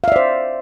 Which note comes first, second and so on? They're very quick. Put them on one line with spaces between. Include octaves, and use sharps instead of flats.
F5 E5 D5 C5